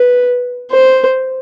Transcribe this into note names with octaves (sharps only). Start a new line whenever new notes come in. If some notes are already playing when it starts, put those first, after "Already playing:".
Already playing: B4
C5